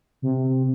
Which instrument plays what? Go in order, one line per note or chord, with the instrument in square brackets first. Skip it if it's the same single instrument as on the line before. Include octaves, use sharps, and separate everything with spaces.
[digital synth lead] C3